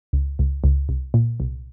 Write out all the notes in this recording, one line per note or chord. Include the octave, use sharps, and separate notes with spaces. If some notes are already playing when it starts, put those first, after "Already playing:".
C#2
C#2
C#2
C2
A#2
C2